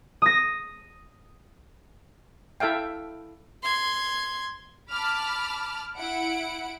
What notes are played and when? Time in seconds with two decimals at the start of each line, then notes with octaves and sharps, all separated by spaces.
0.22 D#6 A#6
2.60 E4 A4 E5 F5 G5
3.63 C6 G#6
4.92 A5 B5 D6 F6
5.97 E4 F#5 D7